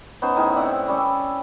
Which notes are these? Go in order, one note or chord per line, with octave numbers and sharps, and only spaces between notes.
B3 C#4 D#4 C5
A2 D#4 G#4
C4 D5 E5 F#5
G3 C#4 A4